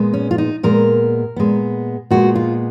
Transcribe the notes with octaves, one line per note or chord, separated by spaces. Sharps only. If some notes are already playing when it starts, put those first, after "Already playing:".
Already playing: A#2 G#3 B3
C#4
F4
D#4
A#2 G#3 B3 A#4
A#2 G#3 B3
A#2 G#3 B3 F#4
F4